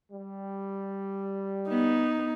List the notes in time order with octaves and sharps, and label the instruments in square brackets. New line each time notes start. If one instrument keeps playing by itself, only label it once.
[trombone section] G3
[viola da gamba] B3 [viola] D#4